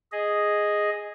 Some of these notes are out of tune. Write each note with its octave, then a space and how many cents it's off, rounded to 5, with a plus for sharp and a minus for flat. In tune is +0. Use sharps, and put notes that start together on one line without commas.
G#4 +0 D#5 +0